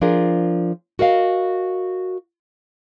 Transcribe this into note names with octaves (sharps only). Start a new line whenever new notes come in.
F3 D4 F4 G#4 A#4
F#4 A#4 D#5 F5